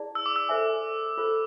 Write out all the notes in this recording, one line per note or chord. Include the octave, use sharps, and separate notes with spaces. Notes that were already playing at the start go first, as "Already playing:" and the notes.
Already playing: E4 G#4 D5 A5
E6
D6
E6
A4 C5 E5 G#5
F4 A4 C5